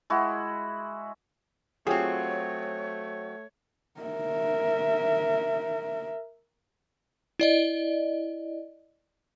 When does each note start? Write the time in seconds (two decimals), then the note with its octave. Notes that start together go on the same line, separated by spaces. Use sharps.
0.10 G#3 E4 F#4
1.87 F#3 A3 C4 F4 G4 G#4 C#5
4.01 A#4 E5
7.40 E4 D5 D#5